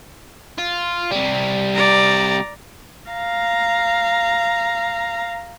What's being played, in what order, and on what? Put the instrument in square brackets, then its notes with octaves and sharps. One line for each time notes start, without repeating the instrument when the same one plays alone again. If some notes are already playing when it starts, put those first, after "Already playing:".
[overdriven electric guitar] F4
C3 G3
[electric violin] D5 A#5
[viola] F5 A#5